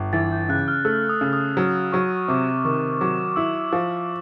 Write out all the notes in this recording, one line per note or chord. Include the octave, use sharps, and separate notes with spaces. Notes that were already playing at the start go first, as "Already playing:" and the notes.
Already playing: G1
E3 A6
G6
C#3 F#6
F6
A3 E6
D#6
C#3
D#6
F#3
F#3 C#6
C3 D6
D#3 C#6
F#3 D6
E4 E6
F3 E6